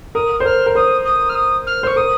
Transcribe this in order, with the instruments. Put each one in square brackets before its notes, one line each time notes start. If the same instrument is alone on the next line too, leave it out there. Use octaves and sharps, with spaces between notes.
[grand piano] A#4 [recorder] D#6
[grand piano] C5
[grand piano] A#4 [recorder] F6
[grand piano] A#4
[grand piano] C5 [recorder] D#6
[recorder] D#6
F6
D#6
F6
[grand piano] C5 [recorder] C#6
[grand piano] A#4 [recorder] D#6